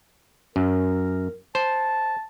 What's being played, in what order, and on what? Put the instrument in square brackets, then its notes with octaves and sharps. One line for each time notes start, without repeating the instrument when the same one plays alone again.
[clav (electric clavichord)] F#2 [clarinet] A#4
[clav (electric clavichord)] C5 [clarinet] A5